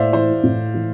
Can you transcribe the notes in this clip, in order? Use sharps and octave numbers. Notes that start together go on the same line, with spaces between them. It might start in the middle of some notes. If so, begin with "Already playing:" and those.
Already playing: A2 C5 D5 E5 F5
E3 C5
A2
E3